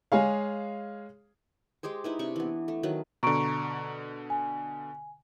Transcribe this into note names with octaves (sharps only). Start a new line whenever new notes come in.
G#3 G#4 C#5 F5
G#3 G4 G#4 C5
D#4 E4 B4
C3 D4 C#6
E3 B3
A3
D#3 F#3 B4
B2 D3 A#5 C#6 D7
G#5